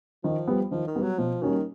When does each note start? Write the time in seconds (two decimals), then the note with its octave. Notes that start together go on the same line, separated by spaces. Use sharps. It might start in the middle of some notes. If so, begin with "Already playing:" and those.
0.24 D#3 F3
0.47 G3 B3
0.71 D#3 F3
0.87 D#3
0.96 G3 B3
1.03 F#3
1.18 B2 F3
1.42 D#3 G3 A#3 C#4 F#4